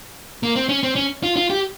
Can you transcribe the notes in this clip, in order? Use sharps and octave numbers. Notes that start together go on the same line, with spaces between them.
A#3
C4
C#4
C4
C#4
F4
F4
G4